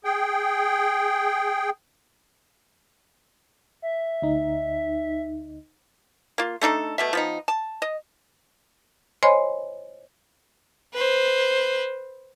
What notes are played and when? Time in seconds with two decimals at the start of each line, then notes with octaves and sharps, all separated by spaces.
0.04 G#4 G5
3.82 E5
4.22 D2 D#4
6.38 A#3 F4
6.61 A3 D4 D#4 A4
6.98 B2 A3 E5
7.13 F3 B3 D#4
7.48 A5
7.82 D#5
9.23 C5 C#5 D#5 G#5 B5 C6
10.94 B4 C5